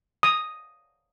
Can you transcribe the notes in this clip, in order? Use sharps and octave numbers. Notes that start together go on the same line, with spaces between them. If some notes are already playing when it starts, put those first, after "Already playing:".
D#6